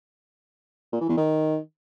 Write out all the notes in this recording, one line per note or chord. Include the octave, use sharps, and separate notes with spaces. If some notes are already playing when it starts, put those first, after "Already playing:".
A#2
E3
E2
D#3